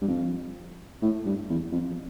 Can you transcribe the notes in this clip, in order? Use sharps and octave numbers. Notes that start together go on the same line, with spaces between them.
G2
F2
A2
G2
E2
F2